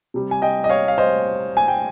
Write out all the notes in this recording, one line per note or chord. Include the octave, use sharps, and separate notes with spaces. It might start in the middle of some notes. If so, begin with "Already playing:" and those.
C3 G3
G#5
D#5 G5
D#5
C#5 F5
F5
C5 D#5
G#5
G5